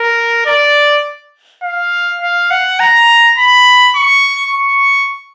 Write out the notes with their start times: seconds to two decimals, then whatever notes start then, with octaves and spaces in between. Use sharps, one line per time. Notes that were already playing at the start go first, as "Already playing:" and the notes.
Already playing: A#4
0.46 D5
1.63 F5
2.22 F5
2.51 F#5
2.80 A#5
3.38 B5
3.96 C#6
4.55 C#6